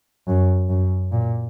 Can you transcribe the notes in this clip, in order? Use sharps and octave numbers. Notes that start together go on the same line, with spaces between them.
F#2
F#2
A#2